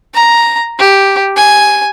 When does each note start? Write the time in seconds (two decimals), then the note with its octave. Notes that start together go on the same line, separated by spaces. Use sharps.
0.15 A#5
0.79 G4
1.37 G#5